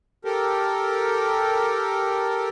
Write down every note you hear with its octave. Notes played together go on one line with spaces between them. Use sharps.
G4 A4 A#4